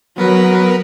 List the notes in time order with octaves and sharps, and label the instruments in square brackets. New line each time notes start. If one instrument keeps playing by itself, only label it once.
[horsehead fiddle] F#3 [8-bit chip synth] B3 A#4 B4